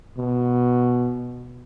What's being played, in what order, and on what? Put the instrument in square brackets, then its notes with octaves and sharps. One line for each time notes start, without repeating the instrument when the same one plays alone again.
[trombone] B2